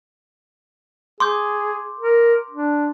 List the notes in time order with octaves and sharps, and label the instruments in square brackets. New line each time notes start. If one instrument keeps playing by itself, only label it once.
[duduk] G#4 [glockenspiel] C6 D6 G6
[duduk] A#4
D4